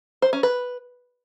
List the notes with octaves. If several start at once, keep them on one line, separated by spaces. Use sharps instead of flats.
C5
C#4
B4